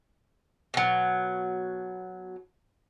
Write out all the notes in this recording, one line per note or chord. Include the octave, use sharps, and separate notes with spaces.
B2 F#3